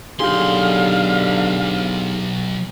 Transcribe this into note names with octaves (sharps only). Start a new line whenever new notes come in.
B1 D3 D#4 G4 G#4 F5 C6